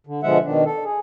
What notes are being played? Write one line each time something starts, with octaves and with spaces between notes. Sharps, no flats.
D3
B2 D3 F3 G#3 E5 F#5
B2 D#3 D4
A4
G#4